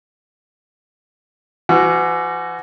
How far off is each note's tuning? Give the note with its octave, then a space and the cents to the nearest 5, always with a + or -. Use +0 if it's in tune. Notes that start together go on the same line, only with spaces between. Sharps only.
E3 +40 F#4 +0